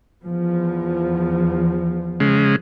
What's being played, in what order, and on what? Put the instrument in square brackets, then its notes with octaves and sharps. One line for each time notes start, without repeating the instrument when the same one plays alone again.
[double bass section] E2 F3
[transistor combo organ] C#3 G#3